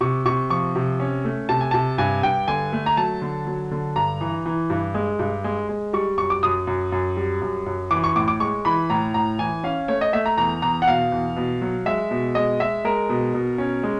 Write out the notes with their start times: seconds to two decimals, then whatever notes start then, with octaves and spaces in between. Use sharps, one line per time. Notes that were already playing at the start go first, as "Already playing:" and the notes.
0.01 C3 C#6
0.26 C3 C#6
0.50 F3 C#6
0.75 C3
1.00 C#4
1.25 A3
1.49 C3 A5
1.61 G#5
1.71 C3 A5
1.98 G2 G#5
2.23 G2 G5
2.48 D3 G#5
2.72 A3
2.86 A#5
2.97 F#3 A5
3.22 D3
3.47 F#3
3.71 D3
3.96 G2 A#5
4.21 E3
4.46 E3
4.70 G2
4.94 G#3
5.19 G2
5.44 G#3
5.69 G#3
5.93 G3 C#6
6.18 F#2 C#6
6.30 D6
6.43 F#2 D#6
6.67 F#2
6.92 F#2
7.17 G3
7.41 F#2
7.66 F#2
7.91 E3 D6
8.04 C#6
8.16 A2 D6
8.28 D6
8.40 G#3 C#6
8.65 E3 B5
8.90 A2 A#5
9.14 A2 A#5
9.39 E3 G#5
9.64 C#4 F5
9.88 A3 C#5
10.01 D#5
10.13 A3 E5
10.26 A#5
10.38 E2 A#5
10.62 E2 A#5
10.82 F#5
10.87 B2 F5
11.12 E2
11.36 B2
11.62 F#3
11.86 G#3 E5
12.11 B2
12.35 G#3 D#5
12.60 G#3 E5
12.85 G#3 A#4
13.09 B2
13.34 B2
13.58 C#4
13.83 G#3